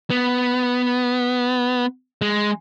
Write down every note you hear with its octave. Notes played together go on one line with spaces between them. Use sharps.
B3
G#3